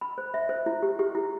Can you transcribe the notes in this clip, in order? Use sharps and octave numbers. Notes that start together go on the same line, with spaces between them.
B5
C5
E5
C5
E4
G4
G4
E4